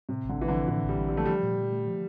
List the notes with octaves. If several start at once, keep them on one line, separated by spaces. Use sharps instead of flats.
A2 C3
A1
D3
A1 E3
D3 F3
A2 E3
A1
G3
A1
G3
F3 A3
F3 G3
A#2
A#2
A3
F3